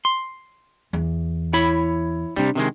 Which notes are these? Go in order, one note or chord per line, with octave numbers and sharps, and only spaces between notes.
C6
E2
E4 C#5 B5
C3 G3 D4
C3 D#3 G#3